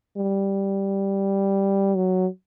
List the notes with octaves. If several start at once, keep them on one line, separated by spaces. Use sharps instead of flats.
G3
F#3